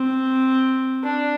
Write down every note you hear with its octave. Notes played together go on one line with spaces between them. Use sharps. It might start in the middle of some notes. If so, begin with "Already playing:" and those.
Already playing: C4
D4